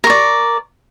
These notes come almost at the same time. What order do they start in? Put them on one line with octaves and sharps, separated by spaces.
A#4 C#6 D5